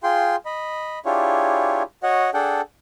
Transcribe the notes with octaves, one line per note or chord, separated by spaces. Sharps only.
F4 G#4 G5 C6
D#5 B5
D4 E4 F4 G4 G#4 C#5
F#4 C#5 D#5 F#5
D4 G#4 A4 F#5 G5